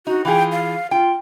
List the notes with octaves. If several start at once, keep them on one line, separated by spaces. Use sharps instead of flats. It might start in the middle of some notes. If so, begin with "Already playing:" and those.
D#4 F#4
E3 F4 G#4 G5
F5
F4 G5